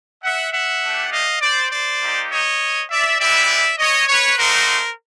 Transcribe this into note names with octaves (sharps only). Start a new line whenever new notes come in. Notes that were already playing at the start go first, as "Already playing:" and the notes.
E5 F#5
E5 F#5
A3 D4 G4
D#5 F5
C5 D5
C5 D5
A#3 D#4 G4
C#5 D#5
D5 E5
G#3 B3 E4 G4 D5 E5
C#5 D#5
B4 C#5
A3 C4 D#4 F#4 A#4 C5